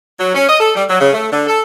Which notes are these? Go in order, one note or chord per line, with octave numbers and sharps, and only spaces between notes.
F#3
C#4
D#5
A4
G3
F#3
C#3
A3
D3
A4